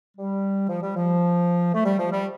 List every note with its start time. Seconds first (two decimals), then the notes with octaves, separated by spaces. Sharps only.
0.17 G3
0.69 F3
0.82 G3
0.96 F3
1.73 A3
1.86 G3
2.00 F3
2.12 G3